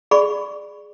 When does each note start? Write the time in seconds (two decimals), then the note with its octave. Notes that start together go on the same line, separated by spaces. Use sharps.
0.11 G#4 D5 B5 C#6